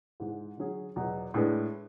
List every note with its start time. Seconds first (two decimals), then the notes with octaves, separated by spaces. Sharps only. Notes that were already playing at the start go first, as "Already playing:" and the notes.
0.20 G#2 E3 G#3
0.57 D3 F#3 C#4 G#4
0.96 E2 B2 F#3 B3
1.34 A2 G#3 D4 G#4 B4